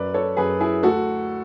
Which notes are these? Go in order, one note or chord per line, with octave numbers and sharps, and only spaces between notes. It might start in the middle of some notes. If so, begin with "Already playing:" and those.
Already playing: F#2 B4 D5
A4 C#5
F#2 G#4 B4
E4 G#4
D2 F#4 A4